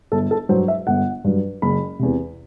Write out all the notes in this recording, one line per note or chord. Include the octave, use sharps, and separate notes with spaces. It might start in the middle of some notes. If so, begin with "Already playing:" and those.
G1 A4
A4
G2 F#3 C5
E5
G1 F#5
G2 F#3
F#1 B5
E2 C3